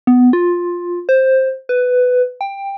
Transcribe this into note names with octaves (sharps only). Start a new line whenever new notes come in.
B3
F4
C5
B4
G5